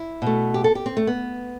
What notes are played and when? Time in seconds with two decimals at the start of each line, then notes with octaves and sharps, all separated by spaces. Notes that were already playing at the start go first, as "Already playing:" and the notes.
Already playing: E4
0.22 B2 A3
0.54 G4
0.64 A4
0.75 G4
0.86 C4
0.97 A3
1.07 B3